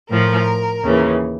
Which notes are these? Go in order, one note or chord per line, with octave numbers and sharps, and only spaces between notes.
A2 F3 A#4
D#2 C#3 E3